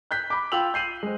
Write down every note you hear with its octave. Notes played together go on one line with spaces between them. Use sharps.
F#6 G6 B6
B5 D6
F4 G5 E6 F7 F#7
G6 C7 D#7 F#7
G#3 C5